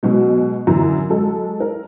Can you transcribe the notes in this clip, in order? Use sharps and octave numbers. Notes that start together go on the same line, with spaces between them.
B2 F#3 G#3
F#2 D3 E3 A#5
F#3 G#3 A4
A#4